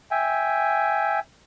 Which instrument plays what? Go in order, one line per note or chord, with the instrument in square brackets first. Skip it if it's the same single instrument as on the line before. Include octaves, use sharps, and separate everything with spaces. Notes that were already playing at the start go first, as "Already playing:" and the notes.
[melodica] E5 G5 G#5